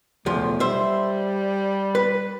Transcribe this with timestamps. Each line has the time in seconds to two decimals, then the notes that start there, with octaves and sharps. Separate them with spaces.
0.26 B1 E2 F3 A3
0.60 G3 C5 E5
1.95 B4